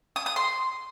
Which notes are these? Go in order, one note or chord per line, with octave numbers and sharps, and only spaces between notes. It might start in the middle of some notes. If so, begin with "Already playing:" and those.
D#6
D#6
C6